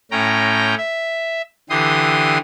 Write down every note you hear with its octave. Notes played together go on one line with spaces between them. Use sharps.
A2 C#4 G5 A#5
E5
D3 E3 G4 C6 D#6